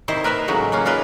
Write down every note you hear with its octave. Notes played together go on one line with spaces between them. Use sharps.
C3 D#3 E4 C5 D#5
A#4 B4 D#5 E5
A2 C#3 F#3 G#3 D#4
A#3 C#4 F4
D#4 F4 A#4 B4 D#5